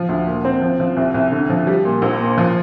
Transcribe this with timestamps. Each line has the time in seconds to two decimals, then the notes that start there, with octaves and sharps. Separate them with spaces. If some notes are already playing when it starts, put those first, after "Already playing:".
Already playing: F3
0.09 D2
0.27 A#2
0.45 C4
0.62 F3
0.80 F3
0.97 C2
1.14 C2
1.32 D3
1.50 F3
1.67 G3
1.85 A#2
2.02 A#1
2.20 A#2
2.38 F3